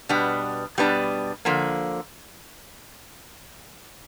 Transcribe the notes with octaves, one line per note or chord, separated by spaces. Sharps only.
B2 G3 B3 D4
B2 G3 B3 D4
D3 F3 A#3